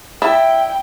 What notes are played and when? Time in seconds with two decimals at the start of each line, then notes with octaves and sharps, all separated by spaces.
0.22 E4 D5 E5 G5 A5